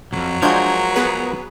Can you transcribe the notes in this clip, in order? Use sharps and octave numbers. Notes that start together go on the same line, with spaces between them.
C2 F2 F#3
F3 G#3 D4 F#4 A#4 G6 G#6
B3 G#4 B4